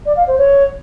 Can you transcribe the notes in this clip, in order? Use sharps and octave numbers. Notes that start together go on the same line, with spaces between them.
D5
F5
C5
C#5